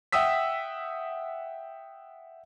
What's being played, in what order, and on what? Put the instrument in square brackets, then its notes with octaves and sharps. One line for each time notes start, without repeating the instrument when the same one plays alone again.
[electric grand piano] E5 F#5 G5 D#6 E6 B6